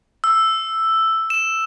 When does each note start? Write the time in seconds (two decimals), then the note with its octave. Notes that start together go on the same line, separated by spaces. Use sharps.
0.24 E6
1.30 E7